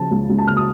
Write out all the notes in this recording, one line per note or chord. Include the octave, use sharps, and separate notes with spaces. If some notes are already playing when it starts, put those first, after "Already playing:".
Already playing: C#3 F3 A5
C#2
C#2
A5
C#3 F6
D#6